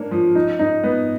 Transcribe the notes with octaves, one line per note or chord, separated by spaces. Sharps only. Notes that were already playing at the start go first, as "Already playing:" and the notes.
Already playing: A#3 D4 C#5
F3
D#4
D#4
B3